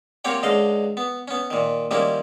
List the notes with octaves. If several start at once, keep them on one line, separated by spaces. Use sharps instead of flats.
A#3 C4 G4 C#5 F#5
C#2 D3 A4 D#5 F5
B3
B3 C#4
A#2 D#3
D#3 F3 G3 A#3 C#4 E4